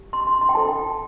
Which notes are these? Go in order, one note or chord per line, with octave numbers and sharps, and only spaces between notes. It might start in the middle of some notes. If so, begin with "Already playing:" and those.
Already playing: G4
C6
C6
C6
G5
F4 A4 C5 A5
G5